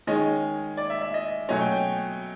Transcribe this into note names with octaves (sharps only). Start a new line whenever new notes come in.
D#3 G#3 C#4 D#5
D5
E5
E5
D#5
B2 F#3 A3 C#4 D#5
G5
G5